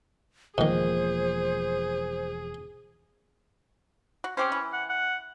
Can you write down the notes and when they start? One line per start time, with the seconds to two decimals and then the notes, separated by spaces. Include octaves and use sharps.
0.58 E1 G#2 D#3 F3 A#3 G#4 C5
4.24 F#4
4.37 C4 C#4 G4 C5
4.52 E3
4.73 F#5
4.89 F#5